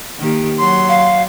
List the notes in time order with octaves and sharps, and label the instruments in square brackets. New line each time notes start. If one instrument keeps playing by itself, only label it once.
[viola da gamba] D#3 A#3 G4
[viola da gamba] F#3 [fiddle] C6
[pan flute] F5